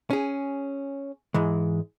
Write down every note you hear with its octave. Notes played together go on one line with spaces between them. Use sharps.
C#4 G#4
G#2 E3 G#3